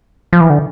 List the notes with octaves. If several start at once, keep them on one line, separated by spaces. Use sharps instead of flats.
F3
E3
D3